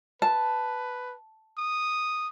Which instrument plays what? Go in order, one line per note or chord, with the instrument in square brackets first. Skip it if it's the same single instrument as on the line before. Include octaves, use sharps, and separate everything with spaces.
[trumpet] B4 [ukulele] A5
[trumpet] D#6